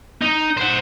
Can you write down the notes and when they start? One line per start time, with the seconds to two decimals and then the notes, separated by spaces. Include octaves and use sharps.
0.21 D#4
0.57 C5 F#5